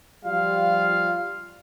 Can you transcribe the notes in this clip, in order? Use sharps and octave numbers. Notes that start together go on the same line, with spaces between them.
F3 G3 F4 F5